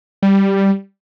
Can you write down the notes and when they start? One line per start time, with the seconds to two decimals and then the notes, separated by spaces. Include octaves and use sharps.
0.23 G3